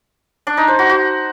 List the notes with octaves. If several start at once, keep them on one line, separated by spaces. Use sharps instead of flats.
D4
D#4
C5
F#4
F#4